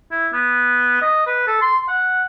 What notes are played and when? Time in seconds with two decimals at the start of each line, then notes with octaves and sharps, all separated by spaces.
0.11 E4
0.33 B3
1.02 D#5
1.26 B4
1.48 A4
1.61 C6
1.88 F#5